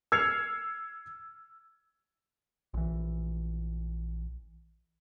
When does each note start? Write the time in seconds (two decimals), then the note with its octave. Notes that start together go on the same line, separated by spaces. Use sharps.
0.12 E6 F6 G#6 C7 C#7 F7
2.74 A#1 E3